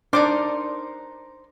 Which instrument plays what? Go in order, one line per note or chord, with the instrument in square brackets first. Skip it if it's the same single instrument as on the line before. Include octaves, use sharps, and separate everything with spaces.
[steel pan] D4 D5 D6 [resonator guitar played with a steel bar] D#4 A#4 C5